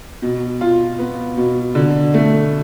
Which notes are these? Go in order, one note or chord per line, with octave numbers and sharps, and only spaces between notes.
B2
F4
B3
B2
D3
A3